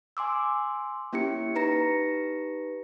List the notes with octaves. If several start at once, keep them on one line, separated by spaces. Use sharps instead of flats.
G#5 C6 D6 E6
A#3 C#4 E4 G4 C#7
D#4 G4 B4 A#5 A#6 C#7